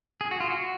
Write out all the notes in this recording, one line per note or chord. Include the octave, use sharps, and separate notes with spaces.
G#4
F#4
F4
F#4